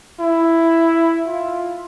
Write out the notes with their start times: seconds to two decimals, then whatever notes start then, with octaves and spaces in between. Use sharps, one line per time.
0.20 E4
1.27 F4